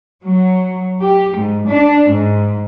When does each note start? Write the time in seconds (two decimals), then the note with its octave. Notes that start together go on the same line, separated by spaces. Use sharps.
0.24 F#3
0.99 G4
1.36 G#2
1.67 D4
2.09 G#2